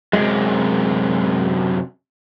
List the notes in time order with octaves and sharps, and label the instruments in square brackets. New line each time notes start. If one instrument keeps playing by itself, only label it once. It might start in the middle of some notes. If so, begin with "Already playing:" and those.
[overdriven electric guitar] F#2 C3 [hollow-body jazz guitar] G#3